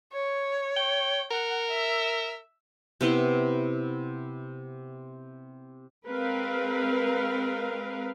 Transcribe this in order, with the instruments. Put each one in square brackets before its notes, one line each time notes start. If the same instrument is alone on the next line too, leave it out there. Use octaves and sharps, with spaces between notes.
[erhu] C#5
[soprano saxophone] G5
[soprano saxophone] A#4 [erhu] F#5
[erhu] E5
[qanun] C3 B3 E4 C6
[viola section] G#3 C4 A#4 B4 F5